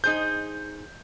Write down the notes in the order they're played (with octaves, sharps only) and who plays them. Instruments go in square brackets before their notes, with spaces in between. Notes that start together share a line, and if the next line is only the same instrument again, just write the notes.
[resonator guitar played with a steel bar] D#4 G#4 C5 [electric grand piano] G6